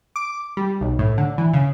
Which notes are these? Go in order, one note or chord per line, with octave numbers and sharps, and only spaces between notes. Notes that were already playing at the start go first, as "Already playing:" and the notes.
D6
G3
B1
A2
D3
E3
C#3